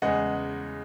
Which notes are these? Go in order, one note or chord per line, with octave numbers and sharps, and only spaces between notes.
E2 C#3 G#3 D#5 F#5